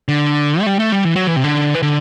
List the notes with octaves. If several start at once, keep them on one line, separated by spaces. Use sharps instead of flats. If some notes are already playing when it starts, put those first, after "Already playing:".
D3
A3
G3
A3
G3
E3
F#3
E3
C3
D3
E3
D3